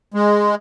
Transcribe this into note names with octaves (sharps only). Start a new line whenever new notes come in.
G#3